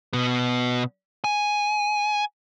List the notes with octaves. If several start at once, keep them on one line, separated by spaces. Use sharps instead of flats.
B2 B3
G#5